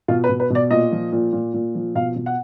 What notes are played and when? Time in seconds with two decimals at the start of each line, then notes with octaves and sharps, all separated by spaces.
0.08 B2 F4
0.24 B4
0.29 B2
0.40 B4
0.50 B2 D5
0.71 A#2 D#5
0.92 F3
1.12 A#2
1.33 A#2
1.54 A#2
1.75 F3
1.95 B2 F5
2.16 B2
2.26 F#5